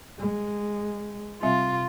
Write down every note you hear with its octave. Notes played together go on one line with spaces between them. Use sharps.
G#3
C3 G3 C4 F4 E5